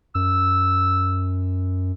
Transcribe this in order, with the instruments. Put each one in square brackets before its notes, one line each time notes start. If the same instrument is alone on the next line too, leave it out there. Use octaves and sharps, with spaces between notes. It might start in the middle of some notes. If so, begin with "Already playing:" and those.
[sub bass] F#2 [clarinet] E6